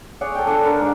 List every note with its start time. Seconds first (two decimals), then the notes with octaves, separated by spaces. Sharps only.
0.21 G#4 C#5 D5 F#5
0.35 A4 G5
0.47 D4 F#5 D6
0.63 D3 A#4
0.80 G#2